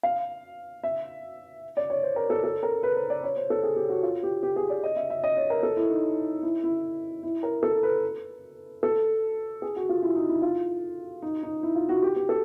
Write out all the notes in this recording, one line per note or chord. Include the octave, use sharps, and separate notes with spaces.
F5
E5
D5
C#5
C5
A#4
A4
A4
A#4
B4
C5
D5
C#5
C5
A4
G#4
G4
F#4
F4
G4
G4
G#4
D5
D#5
E5
E5
D#5
C#5
A#4
A4
E4
D#4
E4
E4
E4
A#4
A4
B4
A4
G#4
F#4
F4
E4
D#4
E4
F4
D#4
D#4
E4
F4
F#4
G4
G4
A4